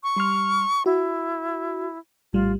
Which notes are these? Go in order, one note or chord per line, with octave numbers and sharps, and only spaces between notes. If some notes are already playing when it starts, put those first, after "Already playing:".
C#6
G3 C6 F6
E4 F#4
A#1 A2 G3 F4